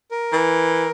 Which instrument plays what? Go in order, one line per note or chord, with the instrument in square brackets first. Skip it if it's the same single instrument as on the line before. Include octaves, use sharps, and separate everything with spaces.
[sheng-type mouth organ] A#4
[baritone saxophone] E3